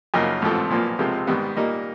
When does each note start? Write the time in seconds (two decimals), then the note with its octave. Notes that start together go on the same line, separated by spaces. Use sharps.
0.14 F#2 C#3 F3 A#3 D#4
0.42 A1 G#2 F3 A3 C4
0.70 B1 A#2 F3 A#3
0.99 C#2 C3 F3 G#3 C4
1.27 G#2 D#3 G3 B3
1.56 A#2 G3 A#3 D#4